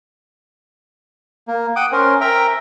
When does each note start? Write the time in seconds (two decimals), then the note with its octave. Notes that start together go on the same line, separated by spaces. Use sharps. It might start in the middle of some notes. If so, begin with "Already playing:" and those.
1.48 A#3
1.76 F#5 G5 D6 D#6
1.92 C#4 A#4 C5
2.21 A#4 E5 G5 A#5